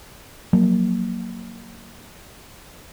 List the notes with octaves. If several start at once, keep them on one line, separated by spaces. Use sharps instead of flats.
F3 F#3 A#3